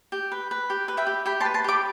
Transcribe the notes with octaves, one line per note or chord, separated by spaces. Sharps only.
G4
B4
B4
G4
B4
E5 G5
G4
G4 G5 B5
A5 C6
B4
A5 C6
G4 B5 D6